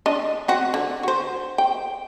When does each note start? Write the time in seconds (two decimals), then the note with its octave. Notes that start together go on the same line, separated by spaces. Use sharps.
0.06 D4 D#5
0.48 C4 F#4
0.74 D3
1.03 F#4 C5
1.58 G5